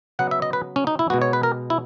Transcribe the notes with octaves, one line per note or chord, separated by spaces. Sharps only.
C#3 F#3 B3 F#5
E5
D#5
B4
C#4
D#4
E4
B2 G#3 B3 F#4
C#5
B4
A#4
E4